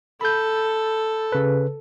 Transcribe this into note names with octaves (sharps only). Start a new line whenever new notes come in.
A4 B5 G6
C#3 B4